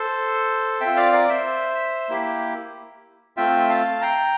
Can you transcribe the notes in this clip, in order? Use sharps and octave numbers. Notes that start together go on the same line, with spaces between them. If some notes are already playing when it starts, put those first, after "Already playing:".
Already playing: A4 C5
C4 F4 E5 G5
D5 F5
A#4 D5
C5 E5
A#3 E4 G4
A3 C4 F4 E5 G5
F5 A5
G5 A#5